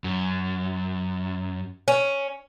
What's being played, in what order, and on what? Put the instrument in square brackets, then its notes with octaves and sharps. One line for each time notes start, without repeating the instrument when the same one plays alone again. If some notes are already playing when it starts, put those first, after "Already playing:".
[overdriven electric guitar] F#2
[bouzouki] C#4